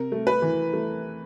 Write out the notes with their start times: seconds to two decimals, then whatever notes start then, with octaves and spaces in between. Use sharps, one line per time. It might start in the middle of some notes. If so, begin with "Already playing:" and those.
Already playing: C3 A#4
0.12 A3
0.27 B4
0.42 E3
0.73 A3